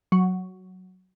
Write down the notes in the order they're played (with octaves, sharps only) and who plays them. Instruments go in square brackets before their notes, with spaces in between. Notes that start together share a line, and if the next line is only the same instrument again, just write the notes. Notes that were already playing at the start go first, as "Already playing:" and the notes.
[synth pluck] F#3